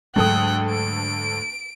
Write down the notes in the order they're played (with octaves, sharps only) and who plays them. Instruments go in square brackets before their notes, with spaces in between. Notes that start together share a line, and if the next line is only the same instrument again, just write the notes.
[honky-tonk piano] D2 A4 D#6 [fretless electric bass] G#2 F#3 G#3 [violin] G5 F#6
[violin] D7